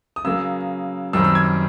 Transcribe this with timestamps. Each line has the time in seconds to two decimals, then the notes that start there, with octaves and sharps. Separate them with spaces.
0.16 D#6
0.24 C#3 F#3 A#3 E6
1.13 F#2 D#3 G3 C4 E6
1.24 E6
1.35 G#6